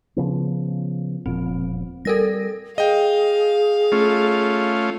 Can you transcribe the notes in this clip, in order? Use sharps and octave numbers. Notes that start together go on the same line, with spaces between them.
C#3 F3 B3
E1 A#2 F3 C4
G3 A4 A#4 A#6
G#4 D#5 F5 G5
A3 C#4 F4